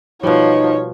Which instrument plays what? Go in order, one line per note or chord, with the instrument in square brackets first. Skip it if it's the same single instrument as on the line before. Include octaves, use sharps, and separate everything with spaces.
[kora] B2 G3 [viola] F3 [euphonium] D#4 [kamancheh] C#5